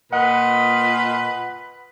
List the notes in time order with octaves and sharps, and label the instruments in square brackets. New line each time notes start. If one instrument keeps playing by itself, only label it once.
[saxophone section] A#2 D#5 [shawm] B4 [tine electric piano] F#5